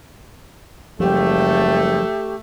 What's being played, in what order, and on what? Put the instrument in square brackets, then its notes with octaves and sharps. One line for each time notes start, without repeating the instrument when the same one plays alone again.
[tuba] F#1 [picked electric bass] F3 G3 [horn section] A3 [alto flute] G4